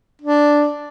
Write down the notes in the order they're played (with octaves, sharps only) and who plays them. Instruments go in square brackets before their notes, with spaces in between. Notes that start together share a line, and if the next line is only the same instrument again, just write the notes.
[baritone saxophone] D4